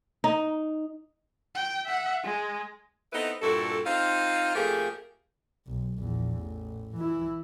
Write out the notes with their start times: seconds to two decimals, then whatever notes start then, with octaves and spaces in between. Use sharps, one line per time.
0.24 D#4
1.55 G5
1.86 E5 F#5
2.24 G#3
3.12 B3 C4 D#4 E4 A4 B4
3.42 G2 A#2 E4 F#4 A4
3.85 C4 D#4 F4 F5
4.55 F2 A3 A#3 G4 G#4
5.67 B1
5.99 A#1 E2
6.39 A1
6.96 E3 E4